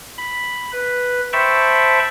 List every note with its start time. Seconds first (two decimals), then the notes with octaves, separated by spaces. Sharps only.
0.18 B5
0.72 B4
1.33 C5 E5 G5 A5 B5 C#6